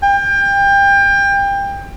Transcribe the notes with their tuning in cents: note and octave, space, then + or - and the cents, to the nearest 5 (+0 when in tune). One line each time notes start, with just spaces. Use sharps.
G5 +25